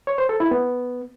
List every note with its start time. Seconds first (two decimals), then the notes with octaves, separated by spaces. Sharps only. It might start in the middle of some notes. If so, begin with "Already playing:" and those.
0.07 C#5
0.18 C5
0.29 A4
0.40 E4
0.51 B3